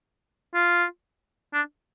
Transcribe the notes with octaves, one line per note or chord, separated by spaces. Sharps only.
F4
D4